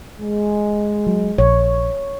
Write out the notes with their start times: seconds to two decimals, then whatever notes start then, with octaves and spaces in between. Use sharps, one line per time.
0.21 G#3
1.07 F#3
1.38 A#1 C#5